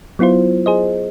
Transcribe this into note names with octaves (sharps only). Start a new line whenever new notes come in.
F#3 B3 E4 F4 C5
G#4 C5 D#5